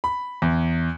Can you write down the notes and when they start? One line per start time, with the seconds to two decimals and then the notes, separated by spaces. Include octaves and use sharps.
0.04 B5
0.42 E2